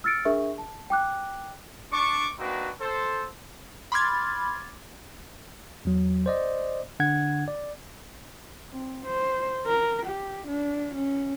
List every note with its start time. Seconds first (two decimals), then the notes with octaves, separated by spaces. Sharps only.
0.04 E6 F6 A6 C#7 D7
0.25 D4 G#4 A#4 E5 C#6
0.58 A5
0.90 G5 D6 F#6
1.92 D4 C#6 D6
2.38 A#3 C4 D4 D#4 F#4 B4
2.80 A4 C5
3.92 B5 C6 D6 F6 G#6 A6
5.85 E2 F#3
6.26 C5 D5 D#5
7.00 D3 D4 F#5 G#6
7.48 D5
8.72 C4
9.06 C5
9.66 A#4
10.06 G4
10.48 D4
10.95 C#4